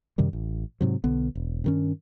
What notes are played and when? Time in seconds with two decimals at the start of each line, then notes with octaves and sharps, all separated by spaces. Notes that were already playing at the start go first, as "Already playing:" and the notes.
0.18 F#2 C3 D#3 G3
0.33 A1
0.81 G#2 C3 F#3
1.04 B1 D3 B3
1.35 E1
1.64 G2 D#3 C#4